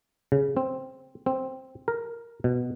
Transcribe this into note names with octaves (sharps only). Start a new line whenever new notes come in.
C#3
C4
C4
A#4
B2